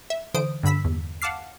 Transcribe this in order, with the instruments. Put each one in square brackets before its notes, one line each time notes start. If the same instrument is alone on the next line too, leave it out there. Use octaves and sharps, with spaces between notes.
[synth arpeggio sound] E5
D3 E3 C5 D#6 D7
G2 D3 B5 E6 B6
E2
F5 F#5 A5 D6 F6 C7